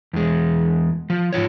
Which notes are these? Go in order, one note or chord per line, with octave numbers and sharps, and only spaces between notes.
E2 G#3
F3
G#2 B2 F4 C#5